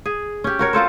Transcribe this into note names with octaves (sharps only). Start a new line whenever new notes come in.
G#4
C#4 G4
F#4 A#4 C#5
C4 F4 A4 C5